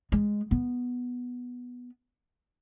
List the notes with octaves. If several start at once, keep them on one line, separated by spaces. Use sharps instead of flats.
G#3
B3